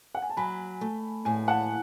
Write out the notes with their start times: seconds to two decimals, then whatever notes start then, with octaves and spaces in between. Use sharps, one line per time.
0.15 F#5
0.22 G#5
0.30 A5
0.37 F#3 G#5 B5
0.81 A3
1.25 A2 G#5
1.47 F#5 A5